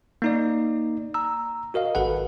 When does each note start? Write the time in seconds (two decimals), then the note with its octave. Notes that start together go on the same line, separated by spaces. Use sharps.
0.22 A#3 D#4 D5
1.14 A#5 E6
1.74 F#4 A#4 D#5 F5
1.95 G#1 A4 B4 F#5